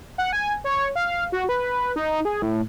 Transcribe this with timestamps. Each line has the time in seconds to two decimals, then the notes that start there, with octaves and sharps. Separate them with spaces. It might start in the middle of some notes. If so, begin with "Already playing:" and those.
0.18 F#5
0.33 G#5
0.64 C#5
0.96 F5
1.32 F#4
1.49 B4
1.96 D#4
2.25 G#4
2.42 A2